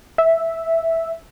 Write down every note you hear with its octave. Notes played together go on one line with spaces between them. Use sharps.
E5